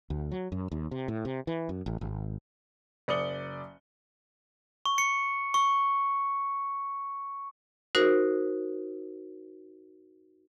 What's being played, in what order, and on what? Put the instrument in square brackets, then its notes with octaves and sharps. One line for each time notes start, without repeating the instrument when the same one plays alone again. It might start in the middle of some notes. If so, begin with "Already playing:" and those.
[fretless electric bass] D2
F#3
F#2
D#2
C3
A2
C3
E3
F#2
A1
G#1
[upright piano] F#1 D5 D#6 C#7 F#7 G7
[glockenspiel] C#6
C#7
C#6
[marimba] D#4 F#4 A#4 C5